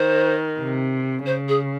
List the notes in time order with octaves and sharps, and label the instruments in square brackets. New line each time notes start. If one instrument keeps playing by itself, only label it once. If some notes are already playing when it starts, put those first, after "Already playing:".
Already playing: [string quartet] D#3 [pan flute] C5
[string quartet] C3
[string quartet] C#3 [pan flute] C5
[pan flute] G#4